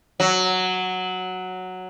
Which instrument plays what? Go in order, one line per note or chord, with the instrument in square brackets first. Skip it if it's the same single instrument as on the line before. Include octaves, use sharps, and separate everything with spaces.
[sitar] F#3